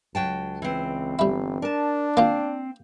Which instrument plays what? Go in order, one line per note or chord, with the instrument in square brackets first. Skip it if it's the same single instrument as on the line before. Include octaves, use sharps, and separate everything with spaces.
[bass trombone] C#2 [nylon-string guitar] F#3 G5 A5
[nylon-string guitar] E3 C4
[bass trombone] G1 [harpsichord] G3 E4
[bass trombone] D4 [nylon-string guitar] A#4 A5
[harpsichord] A#3 F4 [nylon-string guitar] C4